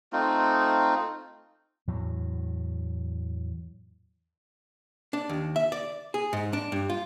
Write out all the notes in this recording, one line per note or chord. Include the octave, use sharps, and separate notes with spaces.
A3 C4 D#4 F4
E2 A2 F#3
D4
D#2
E5
D5
G#4
G#2
D4
G2
F4